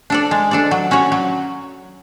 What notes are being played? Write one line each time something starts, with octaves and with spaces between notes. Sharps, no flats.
D4 A4 D5
G#3
D4 A4 D5
F#3
C#4 F#4 C#5
F#3